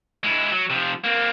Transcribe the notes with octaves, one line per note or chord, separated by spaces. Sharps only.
G#3 E4
F#3
C3 F3
A#3 C4